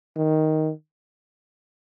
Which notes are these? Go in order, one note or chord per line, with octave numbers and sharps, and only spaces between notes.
D#3